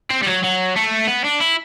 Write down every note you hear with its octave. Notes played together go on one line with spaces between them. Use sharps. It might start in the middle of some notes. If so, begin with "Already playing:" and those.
C4
G3
F#3
F#3
A3
B3
D4
E4